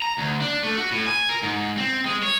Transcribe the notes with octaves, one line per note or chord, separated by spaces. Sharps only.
A#5
D2
D4
A3
F#4
A2
G#5
A#4
G#2
C4
G#3
C#5